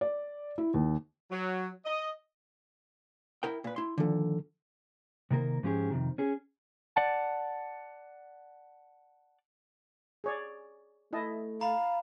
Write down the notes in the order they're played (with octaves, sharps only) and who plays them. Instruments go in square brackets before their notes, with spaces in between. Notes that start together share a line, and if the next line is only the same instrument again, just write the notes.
[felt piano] D5
E4
D#2
[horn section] F#3
D#5
[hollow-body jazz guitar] E4 A#4 G5
A#2 B4
E4 C6
[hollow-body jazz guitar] A#2 D3 [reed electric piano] D#3 F3 A4
[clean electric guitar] C3 D#3 A#3 A#4
G#2 F3 C#4 G4 G#4
F2 C3 D#3
C#4 G#4
[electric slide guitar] D5 F#5 A5
[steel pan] G#4 C#5 D5
[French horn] A3 [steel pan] E4 D#5 A5
[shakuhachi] F5 [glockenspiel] A#5 B5